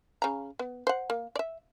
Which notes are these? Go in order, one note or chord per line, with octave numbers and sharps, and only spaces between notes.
C#3 A#5
B3
C5 F#5
A#3
D5 E5